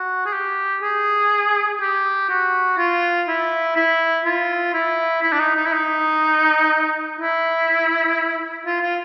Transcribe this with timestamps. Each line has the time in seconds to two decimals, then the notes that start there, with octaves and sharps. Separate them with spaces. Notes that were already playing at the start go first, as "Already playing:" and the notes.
Already playing: F#4
0.26 G#4
0.33 G4
0.82 G#4
1.81 G4
2.29 F#4
2.78 F4
3.28 E4
3.76 E4
4.25 F4
4.74 E4
5.22 E4
5.32 D4
5.39 D#4
5.56 D#4
5.66 E4
5.73 D#4
7.19 E4
8.66 F4
8.81 F4